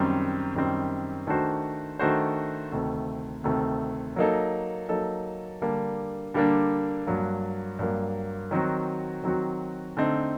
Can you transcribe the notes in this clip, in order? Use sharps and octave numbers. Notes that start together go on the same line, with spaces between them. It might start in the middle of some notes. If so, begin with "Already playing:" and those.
Already playing: F#2 D#3 G3 C4
F#2 D#3 G3 C4
D#3 A3 D4 F#4 C5
D#3 A3 D4 F#4 C5
D2 C3 D#3 A3
D2 C3 D#3 A3
F#3 A#3 D#4 A4
F#3 A#3 D#4 A4
D3 G3 A#3 D4
D3 G3 A#3 D4
G2 F#3 A#3
G2 F#3 A#3
D#3 F#3 C4 F#4
D#3 F#3 C4 F#4
D3 A3 C4 D#4